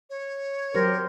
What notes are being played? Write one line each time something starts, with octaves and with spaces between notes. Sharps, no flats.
C#5
F#3 G4 A#4 C5